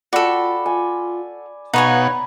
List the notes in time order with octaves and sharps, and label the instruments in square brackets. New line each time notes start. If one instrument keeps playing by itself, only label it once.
[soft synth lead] F4 [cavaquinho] F#4 A4 [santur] D5 G5 B5
[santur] G#5
[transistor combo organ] B2 F#5 [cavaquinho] D#4 C#5 G#5 [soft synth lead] F5 [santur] A#5 B5